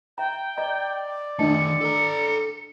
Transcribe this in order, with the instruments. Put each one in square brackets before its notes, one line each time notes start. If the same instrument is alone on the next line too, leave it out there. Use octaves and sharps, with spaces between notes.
[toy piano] E5 A#5 [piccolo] G5
[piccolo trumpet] D5 [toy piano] D#5 A#5
[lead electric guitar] D#3 A3 [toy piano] D4 D#5 A5 [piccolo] C#7
[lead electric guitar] A4 A#5